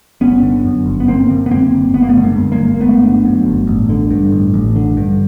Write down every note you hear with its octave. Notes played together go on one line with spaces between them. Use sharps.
G1 B3 C#4
D3
F#2
G1
B3
G1 A#3 C4
D3
B3
F#2 A#3 C4
G1
G1 B3
A#3
A3 B3
D3
G#3 A#3
F#2
G#3 A#3
G1
A#3
G1 A3 B3
D3
F#2
G1
A1
D3
G2
A1
A1
D3
G2